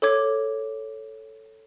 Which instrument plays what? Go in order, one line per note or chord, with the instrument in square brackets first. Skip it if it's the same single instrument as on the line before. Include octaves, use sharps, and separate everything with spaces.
[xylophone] A4 C#5 D6 G#6